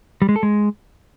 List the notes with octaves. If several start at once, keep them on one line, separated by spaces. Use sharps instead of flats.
G3
G#3
A4
G#3